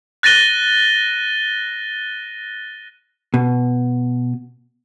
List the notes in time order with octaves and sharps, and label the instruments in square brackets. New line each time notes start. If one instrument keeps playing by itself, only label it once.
[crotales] F#6 A6 A#6 D#7 G7
[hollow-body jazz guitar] B2